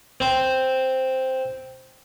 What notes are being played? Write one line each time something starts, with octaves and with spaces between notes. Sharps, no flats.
C4 C5